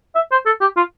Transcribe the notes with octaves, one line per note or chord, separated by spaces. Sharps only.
E5
C5
A4
G4
F4